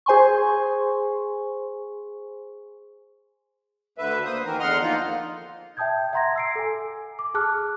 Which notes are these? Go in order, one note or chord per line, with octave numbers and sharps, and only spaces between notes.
G#4 C5 G#5 C6 C#6
D2 D3 B4 E5
A#3 C5 D#6
D#3 E3 A#4
E2 D3 D#5 F#5 C6 F6
F3 A#3 D#4 F4
E5 G5 A5 D#6 G6 G#6
E5 F#5 A#5 C6 G#6 A#6
E6 C7 D7
A4 G#5
D6
G#4 A5 D6 F6 F#6